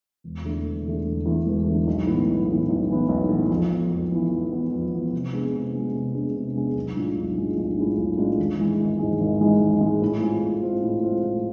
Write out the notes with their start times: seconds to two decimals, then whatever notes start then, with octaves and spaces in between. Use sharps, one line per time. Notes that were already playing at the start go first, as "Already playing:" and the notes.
0.24 E1
0.44 E2 D3 A3
0.65 E1
0.85 E2 D3 A3
1.06 E1
1.26 E2 D3 A3
1.46 E1
1.67 E2 D3 A3
1.87 B1
2.07 A2 E3 B3
2.27 B1
2.48 A2 E3 B3
2.69 B1
2.89 A2 E3 B3
3.09 B1
3.29 A2 E3 B3
3.50 F2
3.70 E3 B3
3.91 F2
4.12 E3 B3
4.31 F2
4.52 E3 B3
4.72 F2
4.93 E3 B3
5.13 C3
5.33 G#3 B3 D4 G#4
5.53 C3
5.74 G#3 B3 D4 G#4
5.95 C3
6.14 G#3 B3 D4 G#4
6.35 C3
6.56 G#3 B3 D4 G#4
6.76 B1
6.96 A2 G#3 D4 F4
7.17 B1
7.37 A2 G#3 D4 F4
7.57 B1
7.78 A2 G#3 D4 F4
7.97 B1
8.18 A2 G#3 D4 F4
8.39 G#1
8.59 G#2 E3 G#3
8.79 G#1
8.99 G#2 E3 G#3
9.20 G#1
9.41 G#2 E3 G#3
9.61 G#1
9.81 G#2 E3 G#3
10.02 A2
10.22 G#3 C4 F4
10.42 A2
10.63 G#3 C4 F4
10.83 A2
11.03 G#3 C4 F4
11.24 A2